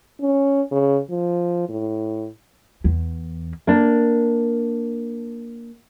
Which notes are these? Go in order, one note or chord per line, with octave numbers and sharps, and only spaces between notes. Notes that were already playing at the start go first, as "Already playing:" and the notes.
C#4
C#3
F3
A2
E2
A#3 D4